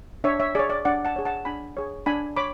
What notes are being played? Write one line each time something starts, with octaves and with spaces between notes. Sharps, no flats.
D4 C#5 E5
C#5 E5
G#4 C#5 D5
D5
D4 D5 F#5
F#5 A5
G#4 C#5
F#5 A5
D4 G#5 B5
G#4 C#5
D4 G#5 B5
C#5 B5 D6